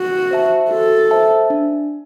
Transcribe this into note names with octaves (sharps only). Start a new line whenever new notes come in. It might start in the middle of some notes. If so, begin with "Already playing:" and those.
Already playing: F#4
C5 E5 A5
F#4 A4
C5 E5 A5
D4